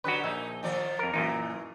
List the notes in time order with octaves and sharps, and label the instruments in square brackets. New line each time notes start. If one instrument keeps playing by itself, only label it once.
[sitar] D3 F#3 G4 [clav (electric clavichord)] F#4 B4
[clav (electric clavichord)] A#1 E5 [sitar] D#4
[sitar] D#3 F3 D5
[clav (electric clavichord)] F2 A#4
[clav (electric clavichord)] F#2 A#2 D#4 [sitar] E3